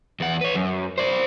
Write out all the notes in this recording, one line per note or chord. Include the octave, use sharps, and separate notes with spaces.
E2 F#5
B4 C#5
F#2
C5 D5